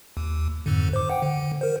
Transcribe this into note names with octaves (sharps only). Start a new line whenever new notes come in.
D#2
F2 G#2 D3
C5 D6
F#5 G5
D3
A#4 C5